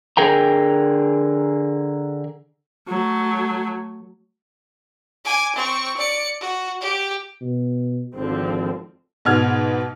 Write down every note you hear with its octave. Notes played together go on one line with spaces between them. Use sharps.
D3 G#4 A#4 G5 A#5
F#3 A3
G#5 D6
C4 C#6
D5 C#7
F#4
G4
B2
G#1 D3 F3 C4
G#2 B2 F6 G#6